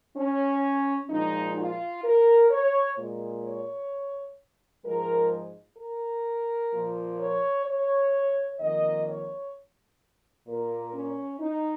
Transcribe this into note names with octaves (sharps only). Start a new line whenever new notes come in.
C#4
A#2 F3 G#3 D#4
F4
A#4
C#5
A#2 G#3
C#5
G#2 F3 G#3 A#4
A#4
A#2 F3 A#3
C#5
C#5
F2 D#3 A#3 D#5
C#5
A#2 A#3 A#4
C#4
D#4